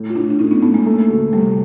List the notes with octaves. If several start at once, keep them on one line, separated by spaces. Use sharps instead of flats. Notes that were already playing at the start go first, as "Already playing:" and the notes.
Already playing: A2
F4
A2 D4 E4
D4
A2 C#4 D#4
B3 C#4
A2 A3 B3
G#3 A#3
A3
D2
C3 G3 A3